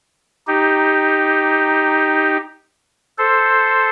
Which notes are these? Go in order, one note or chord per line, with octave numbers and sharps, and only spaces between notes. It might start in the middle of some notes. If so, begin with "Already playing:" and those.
D#4 G4
A4 C5